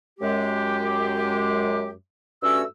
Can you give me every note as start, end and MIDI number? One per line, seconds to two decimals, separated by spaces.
0.20 1.92 42
0.20 1.92 56
0.20 1.92 67
2.43 2.62 43
2.43 2.62 57
2.43 2.62 61
2.43 2.62 66
2.43 2.62 88